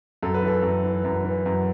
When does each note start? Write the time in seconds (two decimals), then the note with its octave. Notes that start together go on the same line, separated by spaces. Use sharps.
0.23 F#2 A4
0.34 B4
0.43 E3
0.48 A4
0.63 F#2
0.84 E3
1.04 F#2
1.24 E3
1.46 F#2